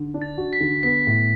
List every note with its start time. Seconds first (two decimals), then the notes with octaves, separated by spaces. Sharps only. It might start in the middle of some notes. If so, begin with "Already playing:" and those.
Already playing: D3
0.14 D4
0.22 A6
0.38 F#4
0.53 B6
0.60 D3
0.83 B3 B6
1.07 A2